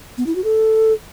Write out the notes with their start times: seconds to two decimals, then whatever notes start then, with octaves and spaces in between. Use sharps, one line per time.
0.18 B3
0.27 E4
0.35 F#4
0.44 A4